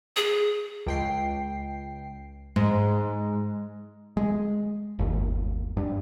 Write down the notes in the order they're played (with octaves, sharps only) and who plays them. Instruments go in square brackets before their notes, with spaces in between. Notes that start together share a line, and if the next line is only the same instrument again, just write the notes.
[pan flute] G#4
[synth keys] C#2 G5 C7
[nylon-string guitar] G#2 [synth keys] G#3
[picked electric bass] G#3
G1 D#2
G2